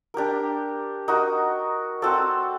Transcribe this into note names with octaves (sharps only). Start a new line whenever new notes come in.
D4 G4 A#4
D#4 F#4 A#4
C4 F#4 A4 D5